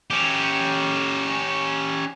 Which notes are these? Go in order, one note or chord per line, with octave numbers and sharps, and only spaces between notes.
C#4 G4